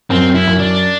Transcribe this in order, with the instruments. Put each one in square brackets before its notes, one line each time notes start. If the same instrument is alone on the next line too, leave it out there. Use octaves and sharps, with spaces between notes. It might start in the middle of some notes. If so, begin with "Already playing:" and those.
[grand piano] F#2 [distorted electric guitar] C4
[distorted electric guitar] E4
[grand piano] F#2
[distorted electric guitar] D4